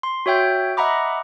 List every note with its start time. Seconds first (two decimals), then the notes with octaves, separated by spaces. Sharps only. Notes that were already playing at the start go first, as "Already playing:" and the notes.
0.03 C6
0.26 F#4 C#5 E5 G5 G6
0.77 D#5 E5 F#5 A#5 B5 D6